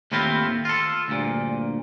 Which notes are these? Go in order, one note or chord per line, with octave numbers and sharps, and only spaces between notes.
D#2 A2 C4 E4 F4
F4 A4
D2 G2 A#2